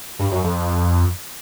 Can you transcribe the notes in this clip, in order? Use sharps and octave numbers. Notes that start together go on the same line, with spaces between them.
G2
F#2
F2